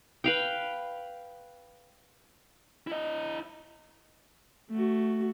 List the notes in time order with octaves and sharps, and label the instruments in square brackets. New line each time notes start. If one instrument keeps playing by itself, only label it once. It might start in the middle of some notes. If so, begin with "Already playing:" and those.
[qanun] B4 F5 G5
[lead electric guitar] E4 D#5
[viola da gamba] A3 F#4